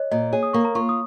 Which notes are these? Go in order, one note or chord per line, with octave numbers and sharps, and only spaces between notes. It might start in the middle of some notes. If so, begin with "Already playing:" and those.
Already playing: C#5 D#5
A#2 D#5
G#4 C#5
D#6
A#3 C#6
A#5
F4 C#6
D#6